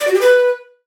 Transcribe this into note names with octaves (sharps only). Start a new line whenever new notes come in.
D5
F#4
G4
B4